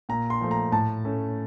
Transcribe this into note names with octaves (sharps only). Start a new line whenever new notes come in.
A#2 A#5
C6
F3 A3
A#5
A2 A5
A3 C#4